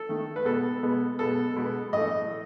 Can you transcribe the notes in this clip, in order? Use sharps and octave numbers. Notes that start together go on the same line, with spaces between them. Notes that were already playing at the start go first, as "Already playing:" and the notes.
Already playing: A4
D#3 A3
B4
B2 G#3 B3 A4
B2 G#3 B3
B2 G#3 B3 A4
B2 G#3 B3
A2 E3 A3 D#5